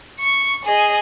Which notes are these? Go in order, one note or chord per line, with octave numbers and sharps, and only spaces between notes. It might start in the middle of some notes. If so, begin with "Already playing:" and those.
C#6
G#4 D#5